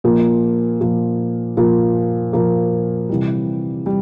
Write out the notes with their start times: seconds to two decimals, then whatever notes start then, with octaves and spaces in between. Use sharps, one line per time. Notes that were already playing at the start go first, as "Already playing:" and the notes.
0.04 A#2 F3 A#3
0.80 A#2 F3 A#3
1.57 A#2 F3 A#3
2.33 A#2 F3 A#3
3.09 C3 E3 G3
3.86 G3